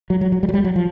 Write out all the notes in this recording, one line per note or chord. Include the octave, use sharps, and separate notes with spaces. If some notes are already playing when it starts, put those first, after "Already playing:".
F#3
F#3
F#3
G3
F#3
G3
F#3
F3